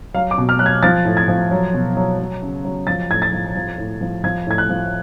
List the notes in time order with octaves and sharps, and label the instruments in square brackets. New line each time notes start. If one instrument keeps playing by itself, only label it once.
[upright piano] F#3 F5
D6
B2
F6
F#3 F#6
G#6
F3 A6
A2
G#6
F3
F#3
B2
F#3
F#3
C#3
F#3
F3 A6
A2 G#6
A6
F3
F3
A2
F3
F3 G#6
A2 G#6
F#6
F3